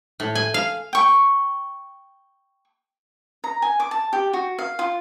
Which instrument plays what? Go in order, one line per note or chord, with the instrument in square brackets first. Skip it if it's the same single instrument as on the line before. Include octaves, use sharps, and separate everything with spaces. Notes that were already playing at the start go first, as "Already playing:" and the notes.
[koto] A2
G#5
F5
[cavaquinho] G5 C#6
A#5
G#5
D6
A5
G4
F#4
F5
F4